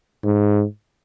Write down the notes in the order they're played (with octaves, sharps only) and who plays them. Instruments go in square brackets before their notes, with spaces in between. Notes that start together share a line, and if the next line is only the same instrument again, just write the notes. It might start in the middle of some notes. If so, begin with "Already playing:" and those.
[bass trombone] G#2